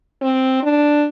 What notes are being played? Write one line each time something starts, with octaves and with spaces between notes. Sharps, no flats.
C4
D4